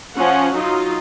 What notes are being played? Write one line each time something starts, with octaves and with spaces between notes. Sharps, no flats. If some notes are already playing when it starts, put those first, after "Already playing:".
F3 C#4 F#5
F#3 D#4 F4